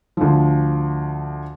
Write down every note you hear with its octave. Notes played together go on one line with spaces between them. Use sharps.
D2 F3